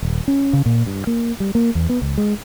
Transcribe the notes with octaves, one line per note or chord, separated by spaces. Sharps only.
D#1
C#4
C#3
A#2
G2
A#3
G3
A#3
E2
B3
C#2
G#3